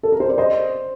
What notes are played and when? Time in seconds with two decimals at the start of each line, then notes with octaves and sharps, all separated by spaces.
0.03 A4
0.12 A#4
0.20 C5
0.29 D5
0.38 C5 D#5